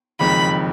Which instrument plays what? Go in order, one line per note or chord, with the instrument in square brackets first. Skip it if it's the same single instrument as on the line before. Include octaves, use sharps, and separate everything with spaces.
[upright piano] F#1 F2 D#3 G#3 [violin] B5